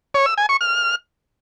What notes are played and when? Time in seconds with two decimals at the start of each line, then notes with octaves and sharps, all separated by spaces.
0.14 C#5
0.26 E6
0.38 G#5
0.49 C#6
0.61 F6